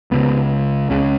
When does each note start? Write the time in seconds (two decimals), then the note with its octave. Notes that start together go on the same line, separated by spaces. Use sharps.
0.11 C#2 C#3 B3
0.90 C#2 C#3 C#4